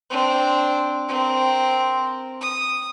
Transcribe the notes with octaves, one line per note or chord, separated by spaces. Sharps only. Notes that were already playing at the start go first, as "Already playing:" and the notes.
C4 D4
C4 A#4
D#6